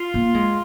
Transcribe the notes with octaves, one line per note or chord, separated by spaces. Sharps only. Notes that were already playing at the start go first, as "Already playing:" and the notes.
Already playing: F4
A#3
G#3